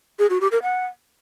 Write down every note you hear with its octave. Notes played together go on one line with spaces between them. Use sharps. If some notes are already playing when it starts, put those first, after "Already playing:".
G#4
F#4
G4
A#4
F#5